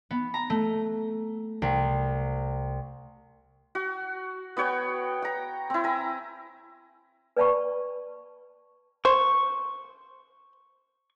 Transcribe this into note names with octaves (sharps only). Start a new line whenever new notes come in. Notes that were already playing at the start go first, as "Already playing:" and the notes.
B3
A#5
A3
C2
F#4
B3 F#4 C#5 G5
G5 A#5
C4 E4
G#5 A#5
B4 D5 F5 A5 B5 C#6
C5 C#6